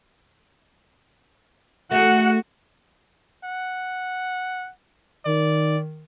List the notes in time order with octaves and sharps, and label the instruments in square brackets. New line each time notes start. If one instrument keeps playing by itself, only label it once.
[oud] A3 G#4 [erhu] F#4 [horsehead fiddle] F#5
[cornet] F#5
[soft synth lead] D#3 [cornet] D5